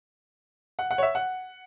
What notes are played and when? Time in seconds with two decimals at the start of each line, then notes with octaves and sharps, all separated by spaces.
0.79 F#5
0.91 F#5
0.98 C#5
1.03 E5
1.15 F#5